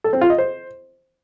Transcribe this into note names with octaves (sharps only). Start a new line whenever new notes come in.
A4
C4
F4
D#5
C5